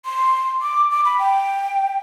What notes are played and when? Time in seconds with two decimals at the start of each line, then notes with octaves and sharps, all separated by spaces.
0.05 C6
0.61 D6
0.91 D6
1.05 B5
1.19 G5